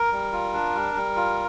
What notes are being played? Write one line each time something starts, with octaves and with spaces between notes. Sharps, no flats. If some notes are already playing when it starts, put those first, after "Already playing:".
Already playing: A#4
G3
F4
D4
G3
G3
F4